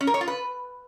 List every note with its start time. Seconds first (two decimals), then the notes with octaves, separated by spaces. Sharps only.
0.01 C#4
0.07 A#4
0.14 C#5
0.21 F4
0.28 B4